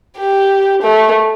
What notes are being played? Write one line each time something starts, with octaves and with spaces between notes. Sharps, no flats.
G4
A3